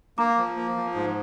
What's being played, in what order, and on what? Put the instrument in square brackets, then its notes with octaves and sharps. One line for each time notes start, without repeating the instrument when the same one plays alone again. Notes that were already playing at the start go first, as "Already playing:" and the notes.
[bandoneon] A#3 [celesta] A#5 D6
[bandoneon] F3
A#3
F3
G#2